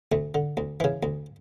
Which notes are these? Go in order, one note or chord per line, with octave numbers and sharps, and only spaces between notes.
D2 A3
D3
D2
C#3 E3
D2